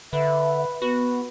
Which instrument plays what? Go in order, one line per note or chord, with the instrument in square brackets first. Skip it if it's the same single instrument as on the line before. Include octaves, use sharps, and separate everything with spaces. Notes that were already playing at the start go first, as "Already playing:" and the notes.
[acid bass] D3 [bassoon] B4 [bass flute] E5
[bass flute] B3 [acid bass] F#4 [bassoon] B4